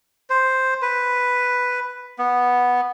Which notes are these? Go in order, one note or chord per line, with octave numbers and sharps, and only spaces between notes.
C5
B4
B3